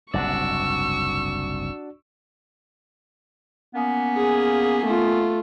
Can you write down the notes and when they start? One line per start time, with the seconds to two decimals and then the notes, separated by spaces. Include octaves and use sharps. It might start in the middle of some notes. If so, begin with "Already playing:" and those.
0.14 F#1 C2 G#2 D4 F#4 D5 C#6 E6
3.75 A#3 B3 C#4
4.17 G#4
4.86 A3 F4